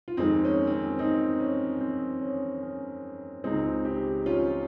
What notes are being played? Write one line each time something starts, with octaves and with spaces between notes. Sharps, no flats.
F4
F2 D#3 G#3 C4 D#4
C#4
C4
C#4
C4 D#4
C#4
C4
C#4
C#4
C#2 C#3 G#3 C4 D#4
D#4 G4
C#4 F4